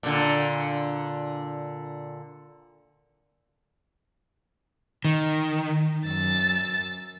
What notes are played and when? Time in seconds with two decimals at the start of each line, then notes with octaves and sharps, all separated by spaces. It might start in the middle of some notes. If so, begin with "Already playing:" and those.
0.03 A#2 D3
5.05 D#3
6.06 F#2 E6 A6